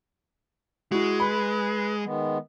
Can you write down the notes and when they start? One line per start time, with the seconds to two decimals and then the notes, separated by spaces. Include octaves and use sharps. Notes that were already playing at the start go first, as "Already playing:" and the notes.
0.92 G#3 E4 F#4
1.20 B4 B5
2.04 D#3 G#3 B3